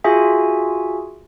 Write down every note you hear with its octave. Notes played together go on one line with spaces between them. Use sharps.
F4 F#4 G#4 E5 G#5